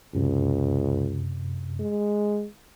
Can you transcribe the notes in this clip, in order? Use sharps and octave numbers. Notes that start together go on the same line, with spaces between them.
C#2 F#2 C3
G#3